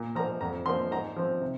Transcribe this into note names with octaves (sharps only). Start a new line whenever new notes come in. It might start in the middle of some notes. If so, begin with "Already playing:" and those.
Already playing: A#2
F3 A#3 A#5
F2 A#5
F3 A#3 C6
G#2 A#5
F3 C4
C3